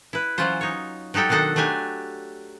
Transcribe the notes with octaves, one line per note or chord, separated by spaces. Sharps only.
E4 B4
E3 F#3 C#4 F4 C5
D#4 C#5
F#3 D#4 G4 A4 G5
B2 D#3 D4 D#4 A4 F#5
F#3 A3 D4 G4 G#5